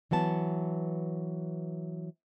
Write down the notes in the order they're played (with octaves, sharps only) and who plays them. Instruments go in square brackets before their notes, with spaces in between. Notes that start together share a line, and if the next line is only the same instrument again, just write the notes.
[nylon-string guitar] E3 F#3 B3 A5